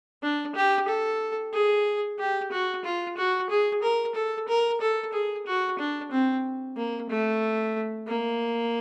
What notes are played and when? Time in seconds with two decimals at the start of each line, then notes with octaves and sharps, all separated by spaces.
0.23 D4
0.55 G4
0.88 A4
1.53 G#4
2.19 G4
2.52 F#4
2.84 F4
3.17 F#4
3.50 G#4
3.82 A#4
4.15 A4
4.48 A#4
4.81 A4
5.13 G#4
5.46 F#4
5.79 D4
6.11 C4
6.77 A#3
7.09 A3
8.08 A#3